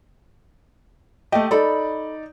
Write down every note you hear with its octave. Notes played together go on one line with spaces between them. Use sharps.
A3 G4 D#5
D#4 A4 D5 B5